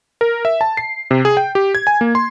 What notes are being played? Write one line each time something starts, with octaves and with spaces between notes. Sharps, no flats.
A#4
E5
A5
C7
C3
G#4
G5
G4
G#6
G#5
A#3
C6